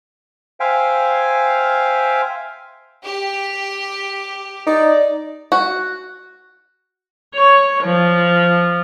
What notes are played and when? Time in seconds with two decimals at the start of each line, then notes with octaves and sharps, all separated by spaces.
0.60 C5 E5 F5 G5 G#5
3.04 G4
4.67 D#4 D5
5.52 F#4
7.34 C#5
7.83 F3